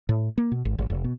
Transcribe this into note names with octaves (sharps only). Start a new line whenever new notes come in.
A2
A#3
B2
G#1
G#1
F1
B2